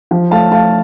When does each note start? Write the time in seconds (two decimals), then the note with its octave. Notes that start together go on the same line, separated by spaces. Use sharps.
0.11 F3
0.31 A3 F5 A5
0.51 A3 F5 A5